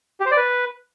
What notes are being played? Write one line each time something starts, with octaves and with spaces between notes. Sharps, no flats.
G4
C5
D5
B4